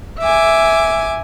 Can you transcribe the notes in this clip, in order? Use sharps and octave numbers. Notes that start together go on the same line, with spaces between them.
E5 G#5 D6